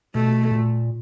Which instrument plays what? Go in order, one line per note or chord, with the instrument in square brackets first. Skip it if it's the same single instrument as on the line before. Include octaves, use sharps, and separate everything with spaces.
[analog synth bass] B2 [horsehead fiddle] A3
[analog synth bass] A#2